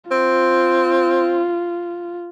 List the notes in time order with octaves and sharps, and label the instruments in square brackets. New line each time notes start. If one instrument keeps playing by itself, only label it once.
[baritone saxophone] C4 [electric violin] F4